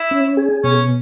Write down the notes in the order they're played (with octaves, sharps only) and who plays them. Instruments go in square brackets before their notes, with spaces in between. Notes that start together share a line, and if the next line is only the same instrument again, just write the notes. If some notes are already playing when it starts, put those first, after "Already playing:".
Already playing: [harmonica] E4
[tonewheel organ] C#4
G#4
[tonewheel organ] B2 [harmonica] C#4